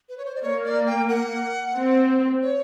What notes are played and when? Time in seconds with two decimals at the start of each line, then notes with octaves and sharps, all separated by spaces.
0.09 B4
0.18 C#5
0.25 C5
0.35 D5
0.42 A#3 C#5
0.64 D5
0.87 G5
1.09 F#5
1.76 C4
2.42 C#5